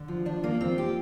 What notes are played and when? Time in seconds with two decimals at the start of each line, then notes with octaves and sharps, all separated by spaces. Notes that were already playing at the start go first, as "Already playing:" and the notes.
Already playing: D3
0.08 F3
0.25 F3 D4
0.43 F3 A#3
0.61 F3 C4
0.78 A#3 G4